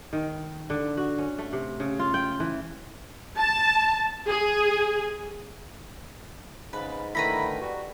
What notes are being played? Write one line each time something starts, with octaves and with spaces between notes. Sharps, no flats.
D#3
D3
F#4
C#4
A3
C3
C#3
F4
G5
E3
A5
G#4
G#2 C#3 B4
D3 D#3 A3 E4 B4 A#5 B5
G3 F#4